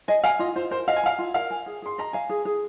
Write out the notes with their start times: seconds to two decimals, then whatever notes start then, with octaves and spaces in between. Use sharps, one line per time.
0.08 D#5 G#5
0.24 F5 G#5
0.39 F4 D#5
0.56 F4 C5
0.71 A#4 C5
0.88 D#5 F5
0.96 G#5
1.03 F5 A#5
1.18 F4
1.34 A#4 F5
1.50 G#5
1.66 G#4
1.82 G#4 C6
1.98 D#5 A#5
2.13 F5 G#5
2.29 G#4
2.45 G#4